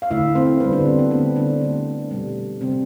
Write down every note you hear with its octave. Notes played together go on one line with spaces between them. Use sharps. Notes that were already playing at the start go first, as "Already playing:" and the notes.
F5
D3 A3 E4 E5
C4 C5
D3 B3 B4
G3
D3 D4
C4
B3
D3 A3 C4
D3 D4
D3 A3
B2 G3
C3 G3 C4 C5